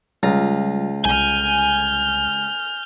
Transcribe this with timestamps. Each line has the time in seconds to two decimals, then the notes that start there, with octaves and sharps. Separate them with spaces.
0.23 C#2 G3 F4 A#5
1.05 C2 G#5 F6 G6